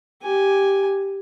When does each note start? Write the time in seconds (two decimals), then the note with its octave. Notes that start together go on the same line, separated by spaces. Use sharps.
0.23 G4 G#5